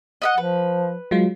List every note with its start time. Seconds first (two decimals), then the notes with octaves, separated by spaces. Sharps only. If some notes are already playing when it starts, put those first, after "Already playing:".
0.22 D#5 E5 F#5
0.38 F3 B4
1.11 F#3 G#3 F4